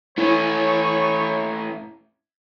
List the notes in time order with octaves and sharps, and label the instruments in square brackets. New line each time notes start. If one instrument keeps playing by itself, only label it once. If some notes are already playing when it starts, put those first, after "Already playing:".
[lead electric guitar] A3 C#4 [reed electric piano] E4 [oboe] C#5